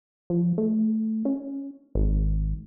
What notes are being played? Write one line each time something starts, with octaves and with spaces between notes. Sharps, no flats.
F3
A3
C#4
G#1